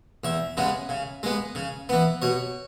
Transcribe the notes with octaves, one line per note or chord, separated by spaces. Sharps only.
E2 E5
C#3 G#3 B3
C#3
G#3 B3
C#3
E3 B3
B2 C#5